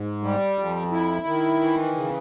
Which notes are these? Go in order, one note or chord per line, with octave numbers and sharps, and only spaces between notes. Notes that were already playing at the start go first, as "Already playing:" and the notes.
Already playing: G#2
G3
F2
E4
D#3
E3
C#3